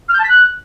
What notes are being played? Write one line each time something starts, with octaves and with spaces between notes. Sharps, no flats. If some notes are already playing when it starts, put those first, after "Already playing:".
F6
G6
A5
B6
F#6